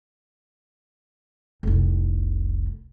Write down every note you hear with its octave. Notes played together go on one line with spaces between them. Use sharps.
F1 C2